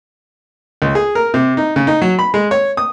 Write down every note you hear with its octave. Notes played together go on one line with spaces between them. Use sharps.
C#2
G#4
A#4
C3
D#4
C#3
D#4
F#3
B5
G#3
C#5
D#6